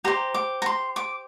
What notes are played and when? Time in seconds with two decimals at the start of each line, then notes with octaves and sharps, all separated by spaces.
0.04 G4 C5 A#5
0.34 D6
0.62 A#5
0.66 C6
0.96 D6